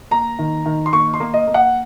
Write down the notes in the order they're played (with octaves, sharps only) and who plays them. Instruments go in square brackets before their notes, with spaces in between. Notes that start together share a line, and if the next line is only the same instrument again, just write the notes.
[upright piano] A#3 A#5
D#3
D#3
C6
A#3 C#6
C6
A#3
D#5
A#3
F#5